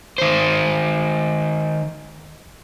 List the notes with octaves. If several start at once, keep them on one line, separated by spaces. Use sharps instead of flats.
D#3 C5